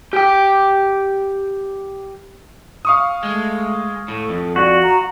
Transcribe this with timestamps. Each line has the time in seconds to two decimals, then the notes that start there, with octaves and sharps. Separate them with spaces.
0.13 G4 G5
2.85 F5 C#6 D#6
3.23 G#3 A3
4.08 A2 A4
4.29 F2
4.56 F#4 D5
4.83 A#5